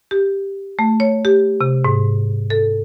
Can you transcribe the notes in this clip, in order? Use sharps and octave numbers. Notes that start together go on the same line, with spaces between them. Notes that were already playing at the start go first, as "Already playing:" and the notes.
G4
A3
C#5
G4
C3
G#2
A4